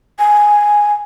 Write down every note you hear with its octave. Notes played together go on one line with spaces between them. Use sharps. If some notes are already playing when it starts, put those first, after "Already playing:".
G#5